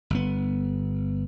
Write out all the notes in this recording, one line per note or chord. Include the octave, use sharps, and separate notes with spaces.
G1 B3